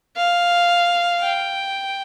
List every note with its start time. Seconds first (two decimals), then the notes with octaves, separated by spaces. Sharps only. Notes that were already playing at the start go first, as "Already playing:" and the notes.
0.17 F5
1.22 G5